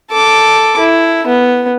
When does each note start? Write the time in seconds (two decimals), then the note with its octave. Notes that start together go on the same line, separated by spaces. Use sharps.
0.11 A4 D6
0.78 E4
1.27 B3